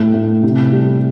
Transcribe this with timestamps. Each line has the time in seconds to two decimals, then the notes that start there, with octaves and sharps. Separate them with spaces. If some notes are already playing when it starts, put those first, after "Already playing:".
Already playing: A2 A3
0.14 A3
0.43 C3
0.73 G3